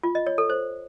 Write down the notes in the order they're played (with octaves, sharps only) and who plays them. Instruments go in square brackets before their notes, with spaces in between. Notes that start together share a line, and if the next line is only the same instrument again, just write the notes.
[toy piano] F4
D#5
C#5
A4
C5